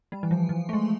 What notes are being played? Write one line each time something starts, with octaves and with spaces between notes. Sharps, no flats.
G3
E3
F3
E3
A3
G#3